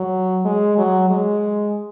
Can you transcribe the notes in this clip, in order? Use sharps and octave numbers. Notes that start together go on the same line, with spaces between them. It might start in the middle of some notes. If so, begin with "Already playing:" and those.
Already playing: F#3
G#3
F#3
G#3